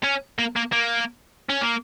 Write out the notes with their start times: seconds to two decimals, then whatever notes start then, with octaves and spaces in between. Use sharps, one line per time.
0.04 C#4
0.39 A#3
0.56 A#3
0.72 A#3
1.49 C#4
1.61 A#3